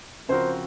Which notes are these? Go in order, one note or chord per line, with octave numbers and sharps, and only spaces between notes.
C#3 F3 C4 F#4 A#4 C5